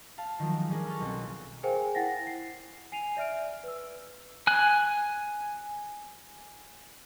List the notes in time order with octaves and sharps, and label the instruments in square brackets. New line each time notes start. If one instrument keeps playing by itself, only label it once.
[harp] F5 A5
D#3 F3 F#3
G#3
G3 C#4 D4 G#4 A#4
A4 C#6 F6 A6
B1 C4
[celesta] G#4 A#4 C5 F5 G5 G#5
E4 F#5 G5 A6 A#6
C7
G#5 C7 D#7 F7
D5 E5 F6 D7
B4 E6
[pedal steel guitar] G#5 F#6